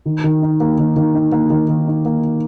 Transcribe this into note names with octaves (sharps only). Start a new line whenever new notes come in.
D#3
D#3
D#4
A#3
D#3
D#3
D#4
A#3
D#3
D#3
D#4
A#3